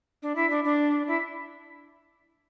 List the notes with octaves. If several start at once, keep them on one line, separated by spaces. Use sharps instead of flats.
D4
E4
D4
D4
E4